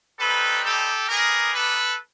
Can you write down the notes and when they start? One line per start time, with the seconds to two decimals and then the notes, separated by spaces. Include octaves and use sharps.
0.19 G3 C4 D#4 A4 B4
0.64 G4 A4
1.08 B3 D#4 G4 G#4 A#4
1.54 A4 B4